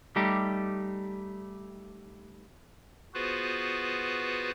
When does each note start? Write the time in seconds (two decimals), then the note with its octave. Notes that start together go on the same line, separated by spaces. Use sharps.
0.16 G3 A3 D#4 G4
3.14 B3 F4 F#4 G#4 B4 C5